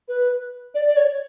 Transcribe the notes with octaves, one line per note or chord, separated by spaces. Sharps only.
B4
D5
D5
C#5